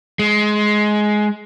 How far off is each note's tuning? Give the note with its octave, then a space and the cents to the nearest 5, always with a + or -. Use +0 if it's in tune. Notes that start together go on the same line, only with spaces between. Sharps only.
G#3 +15